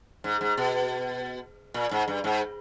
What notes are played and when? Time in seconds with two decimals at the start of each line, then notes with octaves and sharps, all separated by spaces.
0.24 G#2
0.41 G#2
0.57 B2
1.74 A#2
1.91 G#2
2.08 G2
2.24 G#2